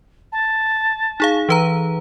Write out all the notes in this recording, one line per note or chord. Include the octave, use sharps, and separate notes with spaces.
A5
D#4 G#4 F5
E3 B4 A#5